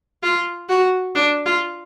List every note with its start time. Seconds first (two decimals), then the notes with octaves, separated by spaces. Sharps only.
0.23 F4
0.69 F#4
1.15 D4
1.45 F4